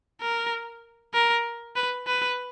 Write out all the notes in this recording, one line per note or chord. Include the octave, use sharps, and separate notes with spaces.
A#4
A#4
B4
B4